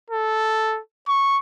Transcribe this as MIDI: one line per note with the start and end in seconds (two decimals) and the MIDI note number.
0.10 0.80 69
1.08 1.38 85